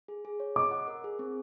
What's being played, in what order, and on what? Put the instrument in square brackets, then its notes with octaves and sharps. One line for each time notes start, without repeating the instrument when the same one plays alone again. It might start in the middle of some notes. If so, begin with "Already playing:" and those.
[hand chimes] G#4
G#4
C#5
[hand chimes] D#5 [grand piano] D6
[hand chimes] F#5
A#4
G#4
C4